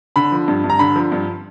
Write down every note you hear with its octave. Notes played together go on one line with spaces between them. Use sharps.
D3 B5
F3
G2
G2
A#5
D3 B5
F3
G2